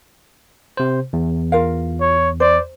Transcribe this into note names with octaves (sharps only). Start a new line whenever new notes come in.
C3 C5
E2
F4 A#4 F5
C#5
C5 D5